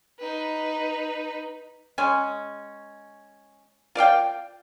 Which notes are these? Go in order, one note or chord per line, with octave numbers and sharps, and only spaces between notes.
D#4 B4
G#3 C#4
F4 D5 F5 G5